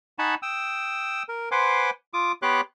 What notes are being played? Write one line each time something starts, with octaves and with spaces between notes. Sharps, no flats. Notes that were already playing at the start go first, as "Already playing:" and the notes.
D#4 F#5 G#5 A5 B5 C#6
G5 D#6 E6
A#4
B4 C5 F#5 G#5 C6 D6
F4 D6 D#6
B3 G4 C#5 C6 D6 F#6